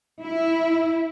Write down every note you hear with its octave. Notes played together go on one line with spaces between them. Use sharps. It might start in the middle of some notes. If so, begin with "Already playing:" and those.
E4